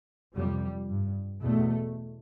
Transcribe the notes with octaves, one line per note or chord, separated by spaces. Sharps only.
F2 C3 G3
G2
E2 B2 A3